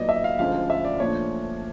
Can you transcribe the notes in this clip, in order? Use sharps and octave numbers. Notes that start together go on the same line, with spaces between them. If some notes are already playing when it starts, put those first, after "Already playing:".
Already playing: A#2 F#3 B3 D#4 D5 D#5
E5
F5
D2 D3 F3 G#3 C#4 F5
E5
D5
A#2 F3 A3 D4 C#5